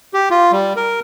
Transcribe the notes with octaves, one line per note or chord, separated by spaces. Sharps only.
G4
F4
G3
A#4